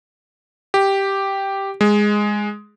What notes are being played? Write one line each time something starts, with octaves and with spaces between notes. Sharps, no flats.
G4
G#3